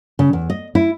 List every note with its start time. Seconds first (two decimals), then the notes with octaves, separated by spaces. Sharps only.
0.19 C#3
0.33 E2
0.50 D#5
0.75 E4